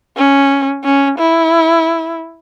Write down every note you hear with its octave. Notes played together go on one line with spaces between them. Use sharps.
C#4
C#4
E4